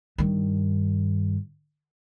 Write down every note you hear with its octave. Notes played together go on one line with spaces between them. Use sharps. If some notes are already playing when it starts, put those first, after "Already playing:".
G2 D#3